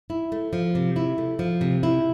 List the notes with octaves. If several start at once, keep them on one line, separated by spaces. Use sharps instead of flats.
E4
A3
F3
C3
E4
A3
F3
C3
E4